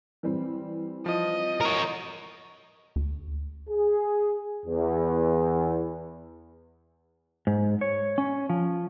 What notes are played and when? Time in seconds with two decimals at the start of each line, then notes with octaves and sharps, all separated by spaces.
0.23 E3 G3 C4
1.06 F3 D#5
1.61 A#4 C#5
2.96 D2
3.70 G#4
4.66 E2
7.47 G#2
7.81 C#5
8.18 C#4
8.49 F3